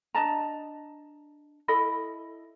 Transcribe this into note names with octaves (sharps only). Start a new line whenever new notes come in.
D4 D#5 A5 A#5
E4 A4 D#5 B5